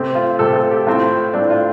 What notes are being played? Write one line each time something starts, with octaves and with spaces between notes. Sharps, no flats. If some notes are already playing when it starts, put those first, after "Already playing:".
Already playing: C3 A3 C4
F4
C3 A3 C4 A4
A4
G4
A2 A3 C4 F4
A2 A3 C4 D4
F4